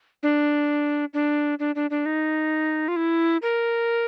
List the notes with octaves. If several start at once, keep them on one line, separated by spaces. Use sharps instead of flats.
D4
D4
D4
D4
D4
D#4
F4
E4
A#4